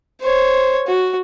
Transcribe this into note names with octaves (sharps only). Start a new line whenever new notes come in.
C5 C#5
F#4